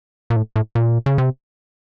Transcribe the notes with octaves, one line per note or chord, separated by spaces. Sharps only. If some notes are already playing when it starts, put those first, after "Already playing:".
A#2
A2
A2
A#2
C#3
C3